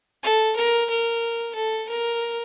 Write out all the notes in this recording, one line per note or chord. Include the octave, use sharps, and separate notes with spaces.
A4
A#4
A#4
A4
A#4